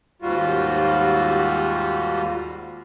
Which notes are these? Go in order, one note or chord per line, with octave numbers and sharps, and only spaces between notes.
D#2 G#2 G3 F4 F#4